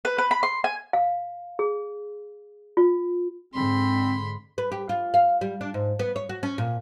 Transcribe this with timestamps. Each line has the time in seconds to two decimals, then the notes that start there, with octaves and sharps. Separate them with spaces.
0.05 B4
0.18 B4
0.31 B5
0.43 C6
0.64 G#5
0.93 F5
1.59 G#4
2.77 F4
3.54 G#2 D3 G#3 C4 B5 C6
4.58 B4
4.72 G4
4.89 F4
5.14 F5
5.41 G3
5.61 D4
5.74 G#2
5.99 B3
6.16 C#5
6.29 F#4
6.43 C#4
6.58 A#2